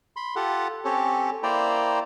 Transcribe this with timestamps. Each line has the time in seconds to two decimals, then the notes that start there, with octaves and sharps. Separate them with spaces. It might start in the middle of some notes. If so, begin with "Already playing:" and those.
0.16 B5 C6
0.36 F4 G4 A4 F#5
0.85 C4 C#4 G4 A4 C#5
1.43 A#3 E4 C5 D5 G5 A#5